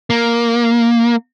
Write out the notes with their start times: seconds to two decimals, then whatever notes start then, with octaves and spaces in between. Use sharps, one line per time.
0.10 A#3